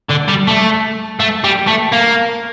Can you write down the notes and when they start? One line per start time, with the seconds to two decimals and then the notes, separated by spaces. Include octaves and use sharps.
0.10 D3
0.28 G3
0.47 A3
1.20 A3
1.44 G3
1.67 A3
1.92 A#3